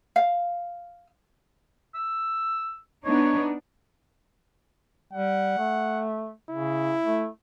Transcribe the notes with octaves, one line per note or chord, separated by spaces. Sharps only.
F5
E6
B3 D4 D#4 C#5
G3 F#5
A3
C#3 E4
A3